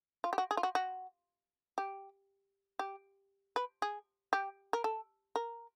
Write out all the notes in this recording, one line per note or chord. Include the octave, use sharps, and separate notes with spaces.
F4
G4
F#4
G#4
F4
F#4
F#4
G4
G4
B4
G#4
G4
A#4
A4
A#4